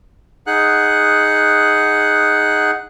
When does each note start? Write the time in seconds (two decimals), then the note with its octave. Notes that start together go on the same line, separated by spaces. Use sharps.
0.47 D#4 G#4 F#5 F#6